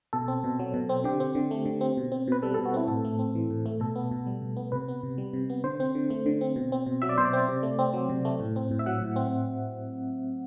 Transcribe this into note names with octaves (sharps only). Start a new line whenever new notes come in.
B2 A4
C4
B2
F#3
B2
C4
D3 G4
C4
D3
A3
D3
C4
B2
C4
B2 B4
G3 A4
A4
B2
F#4
C4 E4
A2 A4
A3
C4
E3
A2
A3
B2 A4
B3
B2
G3
B2
B3
C3 B4
B3
C3
G3
C3
B3
D3 C5
C4
D3
A3
D3
C4
B2
C4
B2
F#3 E5
D5
B2 C5
D5
C4
C3
A3
C4
F#3
C3
A3
A2
C4
A2
E5
F#3 F#5
A2
C4